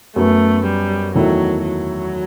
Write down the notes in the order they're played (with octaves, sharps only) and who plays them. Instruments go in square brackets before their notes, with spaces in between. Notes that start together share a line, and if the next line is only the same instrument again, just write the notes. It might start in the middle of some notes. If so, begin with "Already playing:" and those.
[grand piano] F#2 F#3 B3 [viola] A3
[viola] G3
[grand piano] E2 D#3 A3 E4 [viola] F#3
[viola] F#3